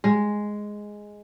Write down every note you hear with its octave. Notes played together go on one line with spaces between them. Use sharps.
G#3